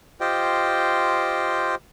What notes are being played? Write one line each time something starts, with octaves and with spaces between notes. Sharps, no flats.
F4 G4 C5 D#5 G5